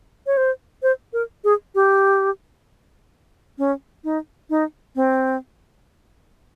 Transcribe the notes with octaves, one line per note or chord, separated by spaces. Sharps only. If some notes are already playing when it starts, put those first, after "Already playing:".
C#5
C5
C5
A#4
G#4
G4
C#4
D#4
D#4
C4